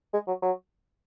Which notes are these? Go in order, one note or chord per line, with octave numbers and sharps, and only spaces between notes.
G#3
F#3
F#3